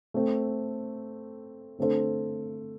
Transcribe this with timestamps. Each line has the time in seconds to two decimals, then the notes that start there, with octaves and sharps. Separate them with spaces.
0.14 A3 C4 A4
1.78 D3 A3 C4 A4 C5